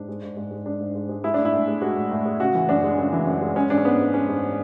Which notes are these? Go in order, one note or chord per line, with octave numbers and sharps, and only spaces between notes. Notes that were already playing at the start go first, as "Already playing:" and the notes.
Already playing: G#2 D4
G#3
G#2
G#2
G#3
G#3 D4
G#2
G#2
G#3
G#3 E4
A2 D4
E4
A2
G#3
G#3 F#4
A2
A2
G#3
C#3 F#4
E3
F#2 D4
G#3
C#3
E3
F#2
G#3
G#3 C#4
G#2 D4
C#4
G#2 B3
G#3
G#3 C#4
G#2